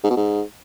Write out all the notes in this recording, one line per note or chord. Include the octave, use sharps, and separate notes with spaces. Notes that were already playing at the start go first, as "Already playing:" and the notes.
G#2
B2
G#2